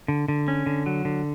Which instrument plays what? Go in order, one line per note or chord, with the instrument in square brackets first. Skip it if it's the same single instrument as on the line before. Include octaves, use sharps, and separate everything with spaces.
[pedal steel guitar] D3
D3
C#4
D3
F#3
D3